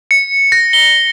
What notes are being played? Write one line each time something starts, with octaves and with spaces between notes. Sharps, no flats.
C#7
A#6
G7